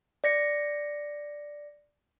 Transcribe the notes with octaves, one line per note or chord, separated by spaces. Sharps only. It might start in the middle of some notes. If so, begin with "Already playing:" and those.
D5 A#6 C#7